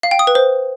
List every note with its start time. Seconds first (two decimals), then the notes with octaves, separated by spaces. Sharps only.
0.03 F5
0.11 G5
0.19 D#6
0.27 B4
0.35 C5